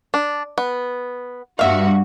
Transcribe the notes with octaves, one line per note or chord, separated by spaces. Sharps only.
D4
B3
G2 F#4 E5 F5